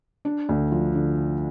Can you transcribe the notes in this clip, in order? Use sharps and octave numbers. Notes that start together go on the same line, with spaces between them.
D4
D2
F3
D3